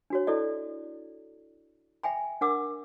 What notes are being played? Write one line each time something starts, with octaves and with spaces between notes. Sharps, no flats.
D4 F#4 C#5
E4 A4 D5 D#5
E5 G5 G#5 B5
D4 A#4 F#5 D6 E6